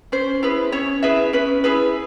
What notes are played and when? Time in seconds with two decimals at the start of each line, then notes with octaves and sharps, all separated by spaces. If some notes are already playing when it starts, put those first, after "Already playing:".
0.12 C#4 C5
0.43 E4 G#4 B4
0.72 C#4 C#5
1.03 E4 G#4 B4 E5
1.33 C#4 B4
1.64 E4 G#4 B4